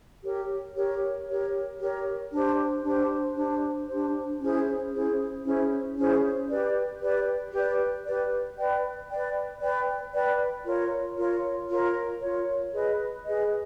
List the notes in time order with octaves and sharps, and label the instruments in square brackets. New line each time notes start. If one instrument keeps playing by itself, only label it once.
[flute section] G4 A#4 C#5
G4 A#4 C#5
G4 A#4 C#5
G4 A#4 C#5
D4 G4 C5
D4 G4 C5
D4 G4 C5
D4 G4 C5
C#4 E4 G#4 C5
C#4 E4 G#4 C5
C#4 E4 G#4 C5
C#4 E4 G#4 C5
G4 B4 D5
G4 B4 D5
G4 B4 D5
G4 B4 D5
B4 D5 G5
B4 D5 G5
B4 D5 G5
B4 D5 G5
F4 A#4 C#5
F4 A#4 C#5
F4 A#4 C#5
F4 A#4 C#5
G#4 B4 D#5
G#4 B4 D#5